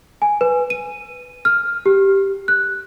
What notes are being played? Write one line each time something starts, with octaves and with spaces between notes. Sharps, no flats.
G#5
B4
D#7
F6
G4
F#6